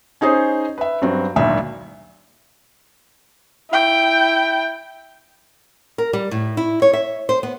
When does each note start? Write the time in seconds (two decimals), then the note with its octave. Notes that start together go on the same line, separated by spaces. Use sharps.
0.21 C#4 D#4 G#4 C5
0.78 B4 E5
1.02 G2 F#3 C4
1.36 G#1 D2 A#2 F#3 E5
3.70 E4 G5
5.98 A#4
6.13 G3
6.31 A2
6.57 E4
6.82 C#5
6.93 E5
7.29 C5
7.43 B3